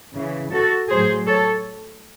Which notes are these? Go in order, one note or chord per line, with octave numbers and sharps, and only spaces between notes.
C#3 E3
F#4 A4
A2 F#3 G#4 C5
A4 C#5